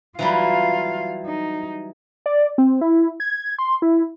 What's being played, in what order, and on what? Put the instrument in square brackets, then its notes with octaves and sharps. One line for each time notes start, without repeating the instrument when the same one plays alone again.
[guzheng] E3 F#3 G3 [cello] F4 F5
[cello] D#4
[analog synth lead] D5
C4
E4
G#6
C6
E4